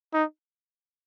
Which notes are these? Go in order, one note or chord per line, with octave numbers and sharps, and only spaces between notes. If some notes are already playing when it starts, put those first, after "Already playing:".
D#4